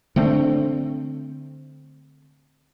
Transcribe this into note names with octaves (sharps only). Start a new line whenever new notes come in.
D3 A3 C4 D4